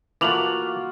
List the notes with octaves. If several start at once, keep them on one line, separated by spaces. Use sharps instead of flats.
E3 A3 A#3 F4 F#4 D6 F7 F#7